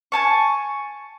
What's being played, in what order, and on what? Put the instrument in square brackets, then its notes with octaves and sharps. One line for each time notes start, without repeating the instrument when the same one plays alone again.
[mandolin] G#5 A5 C#6